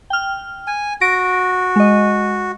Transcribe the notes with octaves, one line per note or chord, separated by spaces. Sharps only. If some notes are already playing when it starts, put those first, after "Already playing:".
G5 F6
G#5
F#4 A#6 D7
G#3 D#5